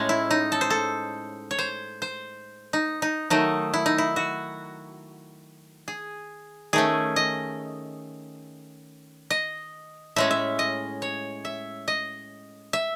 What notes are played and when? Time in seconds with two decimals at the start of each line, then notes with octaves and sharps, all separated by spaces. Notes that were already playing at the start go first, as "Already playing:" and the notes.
Already playing: A2 G#3 C#4
0.09 E4
0.31 D#4
0.52 A4
0.61 C5
0.70 A4
1.51 C#5
1.59 C5
2.02 C5
2.73 D#4
3.02 D#4
3.30 D#3 F#3 A3 D#4
3.74 E4
3.86 D#4
3.98 E4
4.16 F#4
5.88 G#4
6.73 D#3 A3 C#4 G#4
7.16 D#5
9.30 D#5
10.16 A2 G#3 C#4 E5
10.31 E5
10.59 D#5
11.02 C#5
11.45 E5
11.88 D#5
12.73 E5